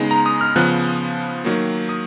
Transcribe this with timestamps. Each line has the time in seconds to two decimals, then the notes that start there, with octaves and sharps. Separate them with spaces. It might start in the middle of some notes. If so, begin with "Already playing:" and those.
Already playing: C#3 G#3 B3 D#4
0.11 A#5
0.26 D#6
0.41 F6
0.56 C#3 F3 B3 F#6
1.44 D#3 F#3 A#3
1.89 D#6